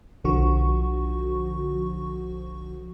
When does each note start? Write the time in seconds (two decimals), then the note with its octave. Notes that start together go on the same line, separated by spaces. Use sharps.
0.24 B1 D3 F3 F#4 C#6